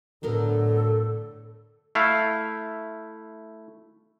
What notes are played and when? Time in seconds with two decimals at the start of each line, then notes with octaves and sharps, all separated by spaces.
0.23 A2 D3 F#3 B3 A4 A#4
1.95 A3 E4 F5